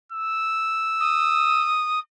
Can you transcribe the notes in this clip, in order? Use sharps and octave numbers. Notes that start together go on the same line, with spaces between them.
E6
D#6